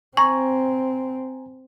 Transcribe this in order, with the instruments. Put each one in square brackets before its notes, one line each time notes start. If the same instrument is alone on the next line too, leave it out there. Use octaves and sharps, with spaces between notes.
[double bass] C4 [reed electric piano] G#5 A#5 [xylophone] C#6